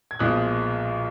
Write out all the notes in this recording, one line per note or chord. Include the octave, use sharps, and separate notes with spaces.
G#6
B1 A#2 F3 G#3 D#6 F#6